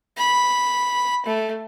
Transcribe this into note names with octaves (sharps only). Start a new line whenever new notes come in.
B5
A3